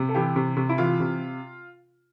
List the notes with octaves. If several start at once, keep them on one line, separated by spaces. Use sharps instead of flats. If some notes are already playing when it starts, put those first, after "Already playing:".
Already playing: C3
A4
E3 G4
C3
C3
E4
E3 F4
C3